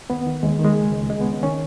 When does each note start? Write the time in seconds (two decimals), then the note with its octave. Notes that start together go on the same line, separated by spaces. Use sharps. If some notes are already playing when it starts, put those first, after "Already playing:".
0.10 D#2 B3
0.27 D#3
0.43 D#2 G#3
0.59 D#3
0.65 G#3
0.76 C#2
0.93 C#2
1.09 C#2 G#3
1.21 B3
1.26 C#3
1.31 C#4
1.43 D#3 C#4